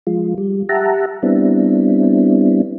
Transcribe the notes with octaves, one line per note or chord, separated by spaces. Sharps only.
F3 G#3 F4
G3
G4 E5 F#5 A5 A#5
G3 B3 C4 D4 E4